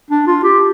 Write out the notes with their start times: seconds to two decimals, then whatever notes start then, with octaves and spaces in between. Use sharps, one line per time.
0.10 D4
0.27 F4
0.43 G4